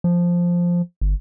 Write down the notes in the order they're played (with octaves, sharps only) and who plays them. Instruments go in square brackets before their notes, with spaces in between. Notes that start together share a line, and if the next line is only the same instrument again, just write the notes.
[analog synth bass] F3
G1